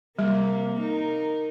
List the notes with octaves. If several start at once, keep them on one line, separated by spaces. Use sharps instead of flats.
C3 G3 A#3
D#4 A#4